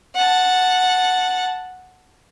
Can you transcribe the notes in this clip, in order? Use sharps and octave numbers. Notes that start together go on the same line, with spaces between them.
F#5 A5